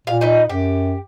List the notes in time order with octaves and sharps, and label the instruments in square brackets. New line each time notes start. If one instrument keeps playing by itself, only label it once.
[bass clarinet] A#2 [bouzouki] F5
[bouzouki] D#4 B4
[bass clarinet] F#2 [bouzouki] G4